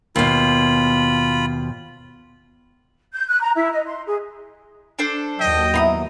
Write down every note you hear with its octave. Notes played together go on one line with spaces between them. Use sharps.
D#2 B2 F4 B5
G6
F#6
A#5
E4
D#5
C6
G#4
D4 A4 C5
D#2 F#3 D#5 G5
B3 E4 A#5 C6 D#6